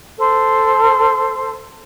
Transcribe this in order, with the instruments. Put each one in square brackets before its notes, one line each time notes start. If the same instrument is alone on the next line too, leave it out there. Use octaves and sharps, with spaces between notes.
[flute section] A4 C5